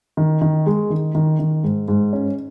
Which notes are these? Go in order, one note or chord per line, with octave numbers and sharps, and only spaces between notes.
D#3
D#3
G#3
D#3
D#3
D#3
G#2
G#2
C#4